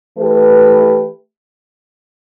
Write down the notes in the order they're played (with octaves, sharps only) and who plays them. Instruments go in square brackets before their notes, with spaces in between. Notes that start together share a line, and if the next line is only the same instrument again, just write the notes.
[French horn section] E3 A3 G4 B4